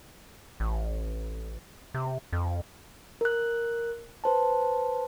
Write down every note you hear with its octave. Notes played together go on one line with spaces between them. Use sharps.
A1
C3
F2
A#4 F#6
B4 C5 A5